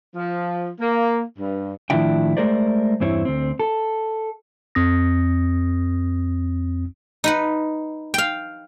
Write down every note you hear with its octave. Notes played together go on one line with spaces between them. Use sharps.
F3
A#3
G2
A2 D#3 F3 D4 E4 G5
G#3 A3 G#4 A#4 C5 D5
E2 G2 C4 E4 C#5
D2 C4
A4
F2 C4 D#6 A#6
D#4 B4 F#5
F5 G5